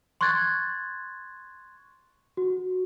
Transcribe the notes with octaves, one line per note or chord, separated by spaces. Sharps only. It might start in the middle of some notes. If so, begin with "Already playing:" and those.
C6 C#6 F#6 G#6 A6
F#4